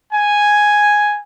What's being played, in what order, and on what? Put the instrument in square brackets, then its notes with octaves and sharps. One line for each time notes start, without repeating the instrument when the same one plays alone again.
[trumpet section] G#5